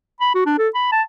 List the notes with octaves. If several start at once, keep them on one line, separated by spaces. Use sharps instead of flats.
B5
F#4
D4
A4
B5
A5